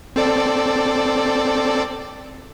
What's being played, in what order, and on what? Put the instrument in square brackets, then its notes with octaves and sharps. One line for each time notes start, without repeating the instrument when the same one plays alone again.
[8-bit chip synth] C4 A4 D5